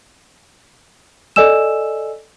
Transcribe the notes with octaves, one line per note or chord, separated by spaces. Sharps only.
A4 D5 D#5 G#5 E6 E7